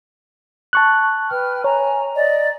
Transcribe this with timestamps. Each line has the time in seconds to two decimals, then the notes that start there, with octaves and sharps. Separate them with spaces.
0.73 A5 C#6 F#6
1.30 B4 G5 F6
1.64 C#5 G#5 A#5
2.15 D5 D#5